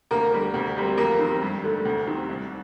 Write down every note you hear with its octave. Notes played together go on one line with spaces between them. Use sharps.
D2 A#3 A#4
D3 G3 A#3
D2
C3 G3 A#3
F2 A#3 A#4
C3 D#3
G2
D3 A3
D2
C3 D#3
C2